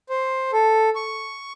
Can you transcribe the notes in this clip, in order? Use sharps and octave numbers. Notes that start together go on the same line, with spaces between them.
C5
A4
C#6